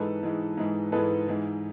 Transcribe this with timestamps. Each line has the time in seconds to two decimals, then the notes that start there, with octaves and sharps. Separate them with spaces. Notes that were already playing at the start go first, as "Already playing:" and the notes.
Already playing: G#2 E3 G#3 A4 B4
0.23 G#2 E3 G#3
0.57 G#2 E3 G#3
0.92 G#2 E3 G#3 A4 B4
1.28 G#2 E3 G#3